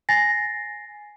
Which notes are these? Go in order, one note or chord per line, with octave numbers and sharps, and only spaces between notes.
G#5 A6 A#6 C7